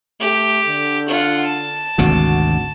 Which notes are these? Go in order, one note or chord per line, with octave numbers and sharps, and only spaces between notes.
A3 G4
D3
F4 F#5
A5
G#1 D2 C3 F#4